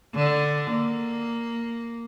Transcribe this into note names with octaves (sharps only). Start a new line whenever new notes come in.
D3
A#3